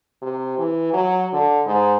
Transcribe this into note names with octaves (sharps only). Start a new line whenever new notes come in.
C3
E3
F#3
D3
G#2